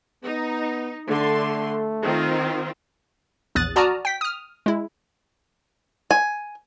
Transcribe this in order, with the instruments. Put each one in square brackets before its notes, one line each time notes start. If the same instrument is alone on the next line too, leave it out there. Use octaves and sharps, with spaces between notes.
[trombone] B3 [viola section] D#4
[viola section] D3 C6 [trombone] A3
[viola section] D#3 C4 F4
[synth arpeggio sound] A#1 E2 D#6 F#6 A6
F#4 D5 A5 A#5 D#6 F6
G5 B6
D#6 F6
G#3 E4
[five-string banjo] G#5